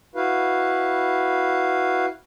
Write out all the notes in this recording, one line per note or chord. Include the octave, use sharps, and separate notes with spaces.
E4 F#4 B4 F5